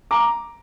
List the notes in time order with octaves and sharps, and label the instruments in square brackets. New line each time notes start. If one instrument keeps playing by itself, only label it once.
[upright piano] A#5 D6